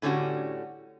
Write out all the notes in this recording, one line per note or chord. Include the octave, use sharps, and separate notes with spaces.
A2 D3 G3 C#4 F#4